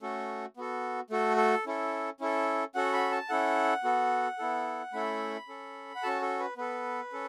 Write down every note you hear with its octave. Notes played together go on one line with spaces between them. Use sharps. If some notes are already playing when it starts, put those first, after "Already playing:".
A3 C#4 F#4 A4
B3 F#4 A4
A3 F#4 A4
A4
C#4 E4 A4
C#4 E4 A4
C#4 F#4 A4 F#5
B5
A5
C#4 E4 A4 F#5
B3 F#4 A4
B3 E4 A4
A3 C#4 E4 A4 B5
C#4 A4
F#5
C#4 F#4 A4 A5
A4
B4
B3 A4 B4
C#4 A4